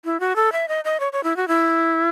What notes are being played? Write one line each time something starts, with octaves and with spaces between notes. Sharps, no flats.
E4
F#4
A4
E5
D#5
D#5
C#5
C#5
E4
F#4
E4